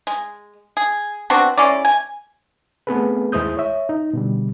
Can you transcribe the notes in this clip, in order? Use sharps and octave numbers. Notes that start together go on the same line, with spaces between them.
G#3
G#4
B3 C4 D4 F#4
G#3 C#4 E4 D5
G#5
A3 B3 C4 G#4 A4 B4
D#2 G#3 E4 C5 D#6 G6
C#5 E5
D#4
B2 D3 G3